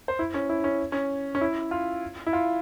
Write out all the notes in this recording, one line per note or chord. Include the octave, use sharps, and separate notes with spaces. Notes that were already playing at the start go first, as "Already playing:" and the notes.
C5
E4
C#4
E4
C#4
C#4
C#4
E4
F4
E4
F4